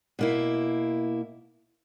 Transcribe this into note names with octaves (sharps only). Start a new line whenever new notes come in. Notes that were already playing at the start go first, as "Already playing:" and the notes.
B2 A#3 E4